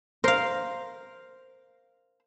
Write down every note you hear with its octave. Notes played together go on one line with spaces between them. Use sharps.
A#4 C5 F5